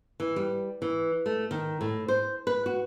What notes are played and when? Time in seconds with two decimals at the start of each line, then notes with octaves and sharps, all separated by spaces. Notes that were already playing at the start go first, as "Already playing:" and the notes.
0.20 E3
0.36 G3
0.82 E3
1.26 A3
1.51 D#3
1.81 A2
2.08 C5
2.47 B4
2.66 F#4